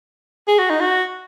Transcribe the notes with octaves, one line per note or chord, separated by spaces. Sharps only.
G#4
F#4
D#4
F#4